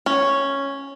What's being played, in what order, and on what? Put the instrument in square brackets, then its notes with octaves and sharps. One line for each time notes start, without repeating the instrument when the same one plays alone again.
[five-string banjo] C#4